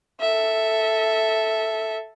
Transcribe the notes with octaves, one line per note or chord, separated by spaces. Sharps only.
A4 E5